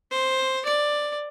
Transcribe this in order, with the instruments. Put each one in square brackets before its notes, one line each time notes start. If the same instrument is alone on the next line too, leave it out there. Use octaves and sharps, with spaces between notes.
[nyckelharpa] C5
D5